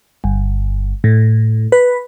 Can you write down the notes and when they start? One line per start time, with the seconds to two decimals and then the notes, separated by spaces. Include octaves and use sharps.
0.24 G1
1.04 A2
1.72 B4